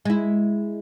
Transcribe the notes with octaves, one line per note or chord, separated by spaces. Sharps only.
G#3 E4